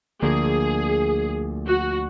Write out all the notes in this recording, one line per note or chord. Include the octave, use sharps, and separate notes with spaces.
D2 D3 F3 A#3 G#4
F#4